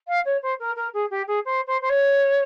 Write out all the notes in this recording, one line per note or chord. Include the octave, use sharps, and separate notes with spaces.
F5
C#5
C5
A#4
A#4
G#4
G4
G#4
C5
C5
C5
C#5